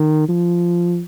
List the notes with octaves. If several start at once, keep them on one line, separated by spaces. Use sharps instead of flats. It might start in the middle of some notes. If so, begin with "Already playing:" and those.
Already playing: D#3
F3